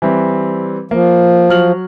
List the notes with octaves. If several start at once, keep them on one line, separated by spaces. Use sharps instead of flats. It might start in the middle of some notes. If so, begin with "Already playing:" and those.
E3 G3 C4
F3 A#3
F#3 F6 F#7